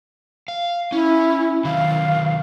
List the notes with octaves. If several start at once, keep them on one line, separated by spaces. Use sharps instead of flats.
F5
C#4 E4
D#3 F#3 F5